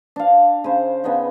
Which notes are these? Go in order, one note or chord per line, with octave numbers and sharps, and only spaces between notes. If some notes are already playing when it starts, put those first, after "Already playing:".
D4 F5
C#3 C5
C#3 B3 D4 D#4